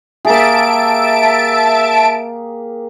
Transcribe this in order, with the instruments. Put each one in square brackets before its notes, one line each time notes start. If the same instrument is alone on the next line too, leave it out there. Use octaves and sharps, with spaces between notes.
[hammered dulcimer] A#3 G4 G#4 [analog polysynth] E5 A5 D7